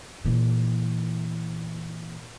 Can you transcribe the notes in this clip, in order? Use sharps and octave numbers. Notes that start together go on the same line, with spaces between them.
A#2 E3